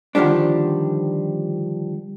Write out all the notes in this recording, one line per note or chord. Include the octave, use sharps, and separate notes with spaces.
D3 D#3 F3 G3 D4